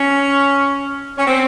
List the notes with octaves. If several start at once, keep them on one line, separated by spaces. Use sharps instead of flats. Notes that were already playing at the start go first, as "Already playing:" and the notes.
Already playing: C#4
C#4
C4